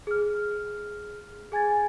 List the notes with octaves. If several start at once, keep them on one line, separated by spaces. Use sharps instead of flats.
G#4 F6
G#4 G#5 G#6 A6